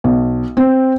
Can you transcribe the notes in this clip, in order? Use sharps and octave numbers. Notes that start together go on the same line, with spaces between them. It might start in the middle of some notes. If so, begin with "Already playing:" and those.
B1
C4